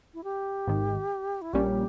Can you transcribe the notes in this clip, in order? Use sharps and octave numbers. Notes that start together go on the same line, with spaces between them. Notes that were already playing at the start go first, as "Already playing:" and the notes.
E4
G4
G#1 G#2 D#3
E4
A#1 A#2 G3 A#3 C#4 G4